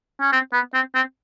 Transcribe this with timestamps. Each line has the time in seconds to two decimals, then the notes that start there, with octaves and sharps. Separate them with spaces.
0.21 C#4
0.32 C4
0.53 B3
0.74 C4
0.95 C4